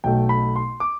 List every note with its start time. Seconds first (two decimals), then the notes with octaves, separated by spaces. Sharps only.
0.04 B1 B2 A3 G5
0.29 B5
0.56 C6
0.80 D6